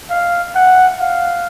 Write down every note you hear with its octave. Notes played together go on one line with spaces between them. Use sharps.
F5
F#5
F5